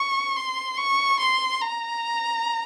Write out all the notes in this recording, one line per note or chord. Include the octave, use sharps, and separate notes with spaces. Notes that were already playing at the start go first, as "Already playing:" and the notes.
Already playing: C#6
C6
C#6
C6
A#5